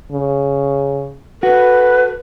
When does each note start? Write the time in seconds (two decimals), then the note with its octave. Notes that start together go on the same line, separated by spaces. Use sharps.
0.12 C#3
1.43 F#4 A4 B4